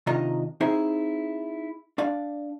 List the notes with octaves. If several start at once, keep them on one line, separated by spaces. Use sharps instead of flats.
C3 D#3 D4 F4 D#5 A#5
C4 D#4 E4 G#4 C5 E5
D4 D5 F5